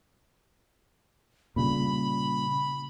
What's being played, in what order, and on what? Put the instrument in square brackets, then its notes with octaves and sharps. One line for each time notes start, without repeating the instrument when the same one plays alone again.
[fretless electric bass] A#2 C#3 G3 [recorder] B5